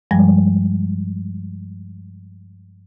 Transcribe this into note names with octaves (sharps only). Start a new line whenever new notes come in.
G2 F3 G3 G#3